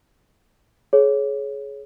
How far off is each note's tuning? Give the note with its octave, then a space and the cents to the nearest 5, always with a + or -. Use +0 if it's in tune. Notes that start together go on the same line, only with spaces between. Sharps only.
G#4 +30 C#5 +0